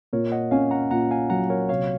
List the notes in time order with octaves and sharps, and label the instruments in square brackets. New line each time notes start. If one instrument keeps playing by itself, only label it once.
[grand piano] A#2 [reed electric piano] A#4 C#5
[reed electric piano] D#5 F#5
[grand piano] C#4 [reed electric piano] F5 G#5
[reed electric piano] F#5 A#5
[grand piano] A#2 [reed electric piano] F#5 A#5
[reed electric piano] F5 G#5
[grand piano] F#3 [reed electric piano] F#5 A#5
[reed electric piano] A#4 C#5
[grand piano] C3 [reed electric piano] C#5 F5